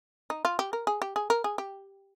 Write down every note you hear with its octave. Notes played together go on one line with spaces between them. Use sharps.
D#4
F4
G4
A#4
G#4
G4
G#4
A#4
G#4
G4